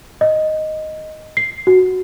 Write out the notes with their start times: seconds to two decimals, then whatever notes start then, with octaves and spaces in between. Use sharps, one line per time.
0.21 D#5
1.37 C7
1.67 F#4